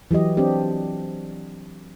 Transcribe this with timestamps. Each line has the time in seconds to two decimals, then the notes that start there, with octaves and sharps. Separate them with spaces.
0.11 E3 F#3 G4 D#5
0.37 C4 D4 G4